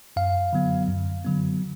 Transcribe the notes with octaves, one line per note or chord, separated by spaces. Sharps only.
F#2 F5
D3 F#3 B3
F#2
D3 F#3 B3